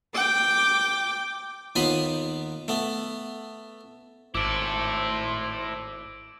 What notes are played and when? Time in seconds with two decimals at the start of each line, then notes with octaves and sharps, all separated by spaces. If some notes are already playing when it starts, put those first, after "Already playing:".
0.15 G5 D6
1.76 D#2 A#3 B3 F4 B5 D#6
2.68 A3 B3
4.35 G#1 E4 A4 C5 D6 E6 D7